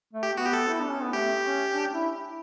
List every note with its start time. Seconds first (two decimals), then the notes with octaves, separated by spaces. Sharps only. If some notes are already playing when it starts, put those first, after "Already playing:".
0.13 A3
0.23 G4
0.33 B3 F#4
0.46 G4
0.53 A4
0.69 E4
0.80 D4
0.91 C#4
1.02 B3
1.13 A3 G4
1.43 C#4
1.73 D4
1.93 E4